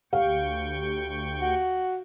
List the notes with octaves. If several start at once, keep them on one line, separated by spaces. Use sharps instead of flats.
D2 G4 F5 G5 C#6
F#4